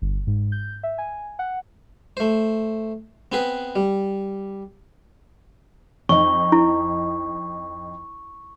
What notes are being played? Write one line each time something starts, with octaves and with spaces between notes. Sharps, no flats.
G1
G#2
G6
E5
G#5
F#5
A3 C5
B3 C4 G#4 B4
G3
F2 D#4 C#6
E4